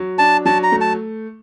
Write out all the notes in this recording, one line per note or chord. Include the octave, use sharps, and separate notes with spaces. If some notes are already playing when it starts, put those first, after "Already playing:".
Already playing: F#3
D4 A5
F#3 A5
A#5
A3
A5